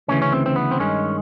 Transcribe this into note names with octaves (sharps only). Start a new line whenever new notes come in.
D2 C#3 E3 C#4
C#4
C4
C4
B3
C4
G2 D#3 G#3 C#4